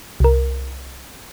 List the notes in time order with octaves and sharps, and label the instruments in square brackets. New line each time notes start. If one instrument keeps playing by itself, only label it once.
[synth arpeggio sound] C2 A#4